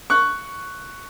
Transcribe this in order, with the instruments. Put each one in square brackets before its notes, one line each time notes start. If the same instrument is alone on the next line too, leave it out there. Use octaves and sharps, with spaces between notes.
[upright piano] C#6 F#6